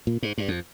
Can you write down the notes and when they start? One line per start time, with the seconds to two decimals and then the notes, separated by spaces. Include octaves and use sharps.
0.07 A#2
0.23 G#2
0.38 G2
0.48 F2